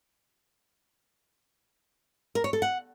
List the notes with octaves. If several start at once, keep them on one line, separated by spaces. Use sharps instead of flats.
A#4
C#5
A4
F#5